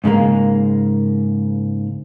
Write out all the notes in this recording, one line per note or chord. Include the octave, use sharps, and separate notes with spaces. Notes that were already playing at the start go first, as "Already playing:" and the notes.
G#2 C#3 G#3 A#3